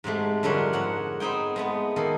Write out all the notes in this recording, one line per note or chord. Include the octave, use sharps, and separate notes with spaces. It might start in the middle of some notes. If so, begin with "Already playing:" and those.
G#2 C3 G#3 A3
F2 D3 G3 D4 A#4 C#5
G#2 C#5 F#5
B3 C4 D#4 G#4 G5
G#3 A3 B3
D#3 A#3 A4